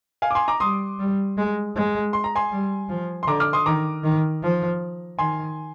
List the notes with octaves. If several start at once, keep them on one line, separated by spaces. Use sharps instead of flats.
F5 G#5
D6
G#5 C6
A#5 D6
G3 C6 D#6
G3
G#3
G#3
C6
A#5
G#5 C6
G3
F3
C6
D3 A#5 D6
D6 F6
C6 D#6
D#3 A#5 D6
D#3
F3
D#3 G#5 C6